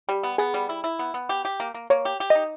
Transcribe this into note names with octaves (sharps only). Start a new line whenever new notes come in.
G3 G4
B3
B3 G#4
G3
E4
E4
B3
B3
G4
G4
A#3
A#3
A#3 C#5
G4
G4
D#5
D#4